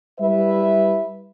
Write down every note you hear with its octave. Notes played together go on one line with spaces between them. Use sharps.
G3 E4 B4 E5